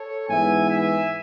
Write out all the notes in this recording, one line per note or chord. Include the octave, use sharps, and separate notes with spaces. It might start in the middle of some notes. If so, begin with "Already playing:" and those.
Already playing: A4 C#5
G#2 E3 B3 E5 G#5
E5 G#5